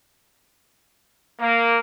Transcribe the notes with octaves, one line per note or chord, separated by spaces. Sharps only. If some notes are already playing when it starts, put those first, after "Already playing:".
A#3